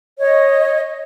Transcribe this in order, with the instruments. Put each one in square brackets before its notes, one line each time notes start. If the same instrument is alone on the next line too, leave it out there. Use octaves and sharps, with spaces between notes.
[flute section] C#5 D#5